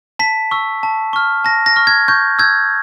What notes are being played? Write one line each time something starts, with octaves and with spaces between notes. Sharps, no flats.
A5 B6
C#6 E6
A5
C#6 F6
A5 A#6
A#6
C#6 F6
G#6
C#6 G6
E6 G6 G#6